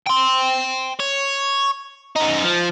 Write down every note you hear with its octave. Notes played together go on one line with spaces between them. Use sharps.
G5 C6
C#5
F#2 D#4
F3